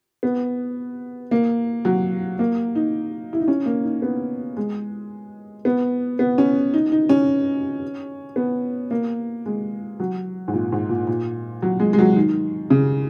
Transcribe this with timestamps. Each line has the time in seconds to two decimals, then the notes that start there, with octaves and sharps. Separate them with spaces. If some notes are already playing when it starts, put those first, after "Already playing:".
0.23 B3
1.31 A#3
1.85 F#3
2.39 A#3
2.75 D#4
3.33 E4
3.40 D#4
3.48 C#4
3.66 A#3
3.84 D#4
4.02 B3
4.57 G#3
5.65 B3
6.19 B3
6.38 C#4
6.74 D#4
6.92 D#4
7.09 C#4
8.36 B3
8.91 A#3
9.46 G#3
10.00 F#3
10.48 G#2
10.54 A#2
10.72 G#2
10.89 A#2
11.07 A#2
11.62 F#3
11.80 G#3
11.93 G#3
11.99 F#3
12.16 D#3
12.70 C#3